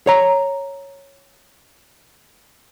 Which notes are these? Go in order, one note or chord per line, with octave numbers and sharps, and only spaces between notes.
C#5 A#5